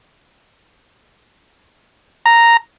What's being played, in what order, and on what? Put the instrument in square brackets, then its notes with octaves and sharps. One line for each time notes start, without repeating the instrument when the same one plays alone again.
[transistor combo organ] A#5